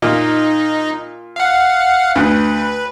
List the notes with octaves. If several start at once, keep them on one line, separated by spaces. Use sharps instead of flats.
A#2 D#4
F5 F#5
D2 B4